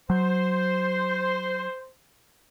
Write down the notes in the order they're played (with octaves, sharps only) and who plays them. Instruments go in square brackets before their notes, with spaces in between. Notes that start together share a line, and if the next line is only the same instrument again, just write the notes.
[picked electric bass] F#3 [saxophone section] C5